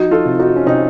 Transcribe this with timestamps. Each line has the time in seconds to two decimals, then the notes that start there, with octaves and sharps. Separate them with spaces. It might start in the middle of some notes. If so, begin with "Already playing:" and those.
Already playing: F3 D#4 F#4
0.11 F4 A4
0.25 C3
0.39 D#4 F#4
0.56 C#4
0.66 C3 C4 D#4